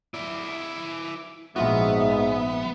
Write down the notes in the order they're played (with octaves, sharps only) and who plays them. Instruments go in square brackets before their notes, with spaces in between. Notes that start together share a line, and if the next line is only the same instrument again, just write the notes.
[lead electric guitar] E4 D5
[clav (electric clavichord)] A#1 F4 F#4 [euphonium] G#2 [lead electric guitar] B3 [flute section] E5 D#6